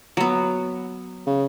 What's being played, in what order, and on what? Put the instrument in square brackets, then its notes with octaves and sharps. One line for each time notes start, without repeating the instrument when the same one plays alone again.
[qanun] F#3 B3
[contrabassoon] C#3